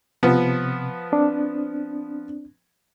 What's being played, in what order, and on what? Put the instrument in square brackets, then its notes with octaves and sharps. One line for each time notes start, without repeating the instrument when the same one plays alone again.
[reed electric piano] C3 [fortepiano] F3 B3
[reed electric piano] C4 D4